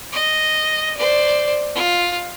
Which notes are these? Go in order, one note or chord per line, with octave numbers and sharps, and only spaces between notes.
D#5
C5 D5
F4